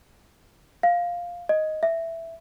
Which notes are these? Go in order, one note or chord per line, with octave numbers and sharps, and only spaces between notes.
F5
D#5
E5